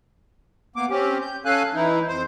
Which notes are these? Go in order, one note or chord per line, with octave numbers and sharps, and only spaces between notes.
A#3 B3 D6
C4 C#4 G4
G6
C#4 A4 F5 G#5 F#6
E3 D#4 E4
F2 C5